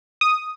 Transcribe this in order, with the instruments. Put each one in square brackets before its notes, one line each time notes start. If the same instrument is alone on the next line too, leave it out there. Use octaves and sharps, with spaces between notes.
[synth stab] D#6